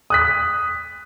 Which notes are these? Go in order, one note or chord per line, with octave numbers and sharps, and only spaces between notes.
D#6 F#6 B6